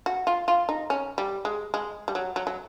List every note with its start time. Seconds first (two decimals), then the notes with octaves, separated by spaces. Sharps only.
0.06 F#4
0.27 F4
0.48 F4
0.69 D#4
0.90 C#4
1.18 G3
1.45 G#3
1.74 G#3
2.08 G3
2.15 F#3
2.36 F#3
2.47 F#3